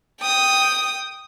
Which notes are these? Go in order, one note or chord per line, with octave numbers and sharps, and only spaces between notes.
G5 D#6